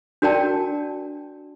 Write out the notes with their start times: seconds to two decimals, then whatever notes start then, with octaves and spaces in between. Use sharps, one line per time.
0.22 D4 F#4 A#4 D5 G5 A5